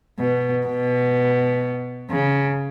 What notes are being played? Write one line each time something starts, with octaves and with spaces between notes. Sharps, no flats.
B2
B2
C#3